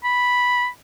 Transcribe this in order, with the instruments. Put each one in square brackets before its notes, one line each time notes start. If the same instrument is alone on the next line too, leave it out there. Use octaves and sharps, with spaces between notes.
[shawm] B5